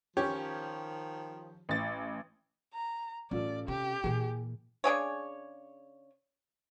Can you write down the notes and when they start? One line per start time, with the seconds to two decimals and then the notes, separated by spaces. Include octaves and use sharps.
0.17 D#3 F3 C#4 G4 C#5
1.69 A1 A6
2.74 A#5
3.31 A1 C#4 F4 A4 D5
3.68 C3 G4
4.04 A#2 E3 G#4
4.84 C#3 D4 G#4 C#5